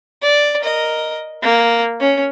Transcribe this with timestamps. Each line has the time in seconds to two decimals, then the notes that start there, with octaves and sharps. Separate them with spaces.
0.22 D5
0.61 A#4 D#5
1.42 A#3
2.00 C#4